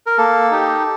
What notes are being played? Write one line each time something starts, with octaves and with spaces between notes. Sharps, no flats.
A#4
A#3 A4
D#4 G4